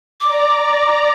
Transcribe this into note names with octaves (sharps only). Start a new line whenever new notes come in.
D5 A#5 D6